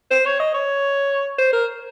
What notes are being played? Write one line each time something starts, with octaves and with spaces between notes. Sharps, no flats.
C5
C#5
D#5
C#5
C5
A#4